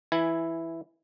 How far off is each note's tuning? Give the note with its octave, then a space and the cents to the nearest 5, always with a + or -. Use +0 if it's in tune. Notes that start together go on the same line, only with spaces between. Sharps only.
E3 +0 E4 +0 G#5 +0